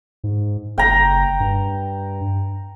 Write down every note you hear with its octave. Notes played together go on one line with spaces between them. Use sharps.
G#2
F#1 G5 A#5
G2